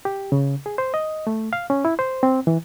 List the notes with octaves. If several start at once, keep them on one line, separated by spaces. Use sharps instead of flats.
G4
C#3
G#4
C5
D#5
A3
F5
C#4
E4
C5
C4
E3